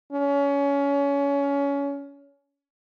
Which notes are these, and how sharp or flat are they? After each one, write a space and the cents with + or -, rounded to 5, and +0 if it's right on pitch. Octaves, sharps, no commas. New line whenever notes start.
C#4 +25